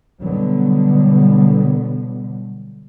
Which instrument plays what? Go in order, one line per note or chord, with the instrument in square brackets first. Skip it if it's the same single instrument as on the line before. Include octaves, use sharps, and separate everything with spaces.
[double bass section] B2 D3 F#3 G3 B3